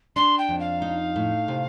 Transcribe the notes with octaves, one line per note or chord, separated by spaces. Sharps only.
D4 C6
G5
F2
F5
D#4
A2
C3